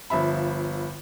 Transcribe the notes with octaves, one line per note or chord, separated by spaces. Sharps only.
G1 F3 E5 B5